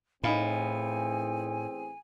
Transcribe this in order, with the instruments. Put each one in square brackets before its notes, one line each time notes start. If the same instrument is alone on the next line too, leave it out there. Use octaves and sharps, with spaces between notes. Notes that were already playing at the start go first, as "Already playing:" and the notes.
[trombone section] A1 C4 G#4 [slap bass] A2 [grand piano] D#4 F5 B5 [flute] G#5